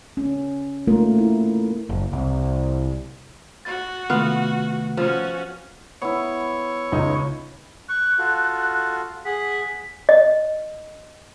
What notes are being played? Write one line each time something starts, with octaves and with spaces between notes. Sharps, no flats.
C#4
A3 A#3 D#4 F4 A#4
E4
F#1
C2
F#4 A6
C3 D#3 A3 B3 F4 F5
F3 C#4 F#4
B3 E4 C#5
C#2 D#4
C#6 F#6
F4 F#4 A4
G#4 F#5 B6
D#5